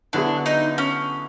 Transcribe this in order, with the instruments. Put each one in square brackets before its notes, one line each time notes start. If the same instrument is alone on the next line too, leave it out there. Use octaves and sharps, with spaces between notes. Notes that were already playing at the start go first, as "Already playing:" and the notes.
[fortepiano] D3 F#3 B3 E4 G#4 [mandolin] D4
[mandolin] D#4
C#4